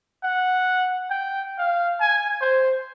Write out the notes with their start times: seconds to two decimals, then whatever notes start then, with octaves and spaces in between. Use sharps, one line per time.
0.23 F#5
1.10 G5
1.58 F5
2.00 G#5
2.41 C5